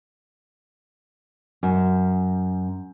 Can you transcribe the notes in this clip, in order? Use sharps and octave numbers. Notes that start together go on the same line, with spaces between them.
F#2